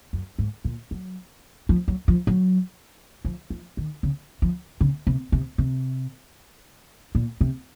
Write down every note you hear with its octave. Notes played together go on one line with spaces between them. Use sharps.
F#2
G#2
A#2
F#3
F3
F#3
F3
F#3
F3
F3
D#3
C#3
F3
C#3
C3
C3
C3
A#2
C3